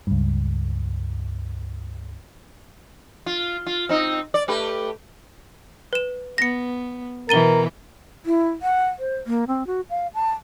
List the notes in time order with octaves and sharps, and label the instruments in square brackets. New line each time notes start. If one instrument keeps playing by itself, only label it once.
[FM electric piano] C#2 G2
[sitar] F4
F4
C4 D#4
D5
A3 G4 B4
[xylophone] B4 E7
[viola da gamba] B3 [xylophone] A#6 C#7
[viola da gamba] B2 E3 [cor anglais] A#4 [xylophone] A6 D#7 G7
[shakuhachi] E4
F#5
C5
A#3
C4
F#4
F5
A5